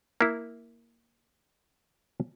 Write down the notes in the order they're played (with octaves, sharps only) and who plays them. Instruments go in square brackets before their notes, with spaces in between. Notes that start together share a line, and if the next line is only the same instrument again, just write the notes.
[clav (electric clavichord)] A#3 E4